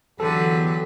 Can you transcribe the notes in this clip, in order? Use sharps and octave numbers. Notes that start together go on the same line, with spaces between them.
E2 D3 F#3 G4 A4 B4